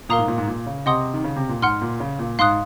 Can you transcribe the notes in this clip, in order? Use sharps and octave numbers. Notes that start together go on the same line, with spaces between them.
A#2 A#4 F5 A#5 D#6
G#2
A#2
G#2
A#2
C#3
C3 D#5 F#5 C6 D#6
D#3
C#3
C3
A#2
G#2 F#5 C6 F6
A#2
C#3
A#2
G#2 F5 C6 D#6 F#6